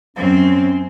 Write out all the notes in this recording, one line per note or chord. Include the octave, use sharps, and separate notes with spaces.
F#2 C4 C#4